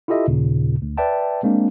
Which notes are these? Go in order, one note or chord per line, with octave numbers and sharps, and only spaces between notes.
E4 F4 G4 A4 D#5 E5
D#2 A#2 C#3
D2
B4 D5 E5 G5 A5
G#3 A#3 C4 D4